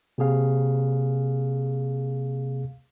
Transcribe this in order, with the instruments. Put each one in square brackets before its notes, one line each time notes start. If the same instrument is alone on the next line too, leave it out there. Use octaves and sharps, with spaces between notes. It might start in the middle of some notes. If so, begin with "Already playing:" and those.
[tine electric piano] C3 A#3 G#4 F5